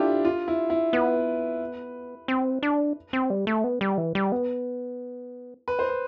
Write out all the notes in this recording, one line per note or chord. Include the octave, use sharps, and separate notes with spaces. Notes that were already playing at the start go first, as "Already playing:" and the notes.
Already playing: D4 E4 F4 G4 A4
F4
E4
E4
B3 B4
C4
D4
C4
G3
A3
B3
G3
E3
G3
B3
B4
C5
B4